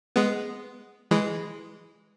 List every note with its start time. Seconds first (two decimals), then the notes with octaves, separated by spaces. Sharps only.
0.16 G#3 B3
1.11 E3 G#3